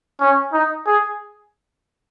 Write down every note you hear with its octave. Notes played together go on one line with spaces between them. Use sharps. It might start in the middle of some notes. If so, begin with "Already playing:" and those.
C#4
D#4
G#4